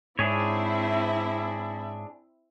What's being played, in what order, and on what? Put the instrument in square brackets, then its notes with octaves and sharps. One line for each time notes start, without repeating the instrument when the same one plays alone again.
[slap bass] G#2 [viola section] C4 E4 E5 [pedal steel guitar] D4 G#4 C#5